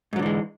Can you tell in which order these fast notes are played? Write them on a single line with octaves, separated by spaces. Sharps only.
G#2 F#3 D3 E3 G#3